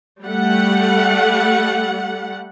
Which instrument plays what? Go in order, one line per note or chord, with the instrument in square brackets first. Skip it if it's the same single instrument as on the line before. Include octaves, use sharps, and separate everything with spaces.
[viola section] G3 A3 F#5